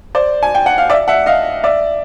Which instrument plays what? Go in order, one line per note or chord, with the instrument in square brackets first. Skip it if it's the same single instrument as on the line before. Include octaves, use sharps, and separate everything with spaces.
[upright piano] C5 D5
G#5
G5
F#5
F5
D5 E5
E5 F#5
D#5 F5
D5 E5